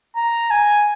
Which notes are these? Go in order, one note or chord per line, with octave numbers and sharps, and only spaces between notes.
A#5
G#5